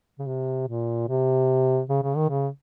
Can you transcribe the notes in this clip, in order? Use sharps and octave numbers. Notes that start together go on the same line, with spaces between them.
C#3
C3
A#2
C3
C#3
C#3
D#3
C#3